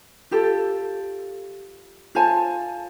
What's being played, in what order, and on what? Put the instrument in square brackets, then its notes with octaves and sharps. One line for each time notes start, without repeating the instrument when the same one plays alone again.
[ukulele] F4 G4 A4
F4 C5 G#5 A5